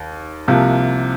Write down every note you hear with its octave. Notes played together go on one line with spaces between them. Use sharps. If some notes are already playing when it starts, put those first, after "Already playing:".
Already playing: D#2
C2 C3 F3 A#3